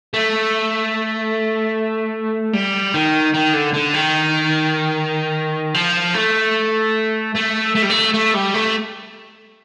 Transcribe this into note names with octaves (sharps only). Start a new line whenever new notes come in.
A3
G3
D#3
D#3
D3
D3
D#3
F3
A3
A3
A3
G3
A3
A3
G3
A3